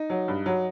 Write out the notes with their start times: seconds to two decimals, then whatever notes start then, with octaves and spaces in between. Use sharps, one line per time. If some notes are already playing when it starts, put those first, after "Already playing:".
Already playing: D#4
0.10 F#3
0.28 G2
0.46 F#3